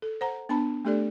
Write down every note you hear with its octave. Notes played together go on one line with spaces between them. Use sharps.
A4
C5 F#5 A#5
B3 D4 A5 B5
A3 D4 G4 A4 D5